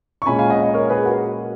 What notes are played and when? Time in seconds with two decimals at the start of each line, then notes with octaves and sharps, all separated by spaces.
0.22 C#6
0.26 A#2 G#3 C#4 G#5 B5
0.39 F5 G#5
0.50 D#5 F#5
0.63 D#5
0.74 A#4 C#5
0.90 G#4 B4
1.05 F#4 A#4